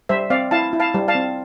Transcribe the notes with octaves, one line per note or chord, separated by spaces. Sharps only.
G3 C5 E5
C4 D5 F5
E4 F5 A5
E4
F5 A5
G3
F5 A5
C4